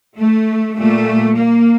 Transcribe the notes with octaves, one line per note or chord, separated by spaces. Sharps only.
A3
A#2 G3 A3
A#3